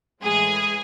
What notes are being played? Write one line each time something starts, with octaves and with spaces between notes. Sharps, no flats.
A2 E3 G#3 G#4